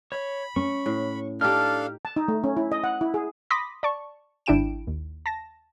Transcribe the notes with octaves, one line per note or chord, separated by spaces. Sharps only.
C#5 B5
C#4 C#6
A2
D4 D#4 G4 A4 F5 F6
A5
D#4
A3
C#4
E4
D#5
F#5
E4
G#4
B5 C6 D6 D#6 A#6 B6
D5 A5 C#6
G#1 D4 E4 G5 D7 E7
D#2
A5 A#6